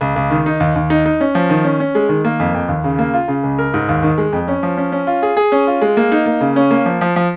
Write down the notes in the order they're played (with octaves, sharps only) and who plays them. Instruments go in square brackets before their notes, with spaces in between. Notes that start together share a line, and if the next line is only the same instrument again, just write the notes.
[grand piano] C#2
C#2
D#3
D#4
D#2
D#2
D#4
D#4
C#4
F3
D#3
C#4
C#4
G#3
D#3
A#3
F2
F2
D#2
C#3
A#3
F4
C#3
C#2
A#4
G#2
D#2
D#3
G#3
F2
C#4
F3
C#4
C#4
F4
G#4
G#4
C#4
F4
G#3
A#3
D#4
A#3
C#3
C#4
A#3
F3
F3
F3